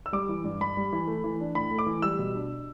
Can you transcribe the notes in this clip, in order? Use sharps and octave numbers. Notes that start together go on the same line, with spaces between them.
E6
G3 D6
E3
G2
G2 B5
G3
E3
A3
E3
D4
A2 B5
A3
D6
E3
G3 E6
B2
D4